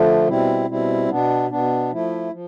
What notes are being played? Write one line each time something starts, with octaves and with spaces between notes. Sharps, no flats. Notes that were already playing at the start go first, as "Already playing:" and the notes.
Already playing: D3 F3 A3
B2 G3 C4 E4
B2 G3 C4 E4
B2 B3 D4
B2 B3 D4
F3 A3 E4
F3